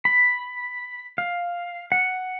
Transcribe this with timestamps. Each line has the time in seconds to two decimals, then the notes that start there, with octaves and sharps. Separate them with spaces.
0.05 B5
1.18 F5
1.92 F#5